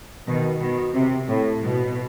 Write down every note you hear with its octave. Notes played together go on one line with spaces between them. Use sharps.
B2 D#3
B2 D#3
C3
A2
B2